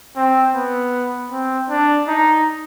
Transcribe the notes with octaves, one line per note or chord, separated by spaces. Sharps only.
C4
B3
C4
D4
D#4